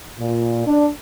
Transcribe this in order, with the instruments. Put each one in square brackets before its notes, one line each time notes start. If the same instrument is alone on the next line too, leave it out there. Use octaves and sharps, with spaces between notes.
[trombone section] A#2
D4